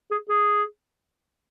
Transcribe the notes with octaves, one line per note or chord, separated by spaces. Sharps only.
G#4
G#4